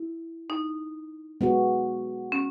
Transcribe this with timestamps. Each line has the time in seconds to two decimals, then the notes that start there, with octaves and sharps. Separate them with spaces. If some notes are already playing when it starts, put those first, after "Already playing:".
Already playing: E4
0.50 D#4
1.41 G#3 B3 F#4
2.32 C#4